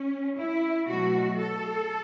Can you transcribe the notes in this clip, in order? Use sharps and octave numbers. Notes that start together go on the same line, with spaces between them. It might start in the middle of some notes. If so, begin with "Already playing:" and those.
Already playing: C#4
E4
B2 F#3 A3 F#4
A4